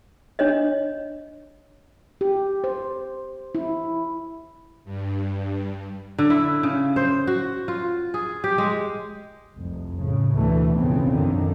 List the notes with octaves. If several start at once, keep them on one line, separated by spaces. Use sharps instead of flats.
D4 C#5 D#5
G4
C5
E4
G2
D3
E4
C#3
C5
F#4
F4
G#4
G4
G#3
F1 C2
A2 C#3
D2 B2 E3 A3
B1 F2 G#2 C#3 B3 C4
F#2 D3 D#3 F3